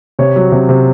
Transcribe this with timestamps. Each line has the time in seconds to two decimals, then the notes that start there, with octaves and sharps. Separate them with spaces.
0.19 C3 C#5
0.36 F#3
0.52 C3
0.69 C3